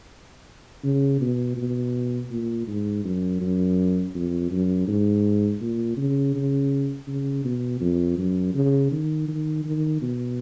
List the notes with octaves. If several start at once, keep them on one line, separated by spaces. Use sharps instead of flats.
C#3
B2
B2
A#2
G#2
F#2
F#2
F2
F#2
G#2
A#2
C#3
C#3
C#3
B2
F2
F#2
C#3
D#3
D#3
D#3
B2